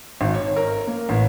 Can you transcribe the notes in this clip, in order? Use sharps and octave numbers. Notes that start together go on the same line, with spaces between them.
G#1
C#5
A#4
A#3
A1